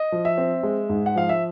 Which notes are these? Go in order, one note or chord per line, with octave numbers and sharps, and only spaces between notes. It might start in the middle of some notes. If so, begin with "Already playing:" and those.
Already playing: D#5
F3
E5
C4
G#3
G#2
F#5
F3 F5
E5